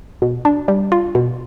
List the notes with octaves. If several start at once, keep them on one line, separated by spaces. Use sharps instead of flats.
B2
D4
G3
F4
B2